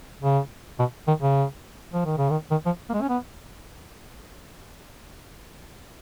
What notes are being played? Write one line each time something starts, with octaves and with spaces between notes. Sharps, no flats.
C#3
B2
D#3
C#3
F3
D#3
C#3
D#3
D#3
F3
A#3
G#3
C#4
B3